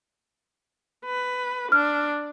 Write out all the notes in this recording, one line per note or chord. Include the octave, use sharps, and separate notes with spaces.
B4
D4 F6